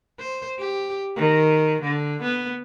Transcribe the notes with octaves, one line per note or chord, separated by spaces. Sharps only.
C5
G4
D#3
D3
B3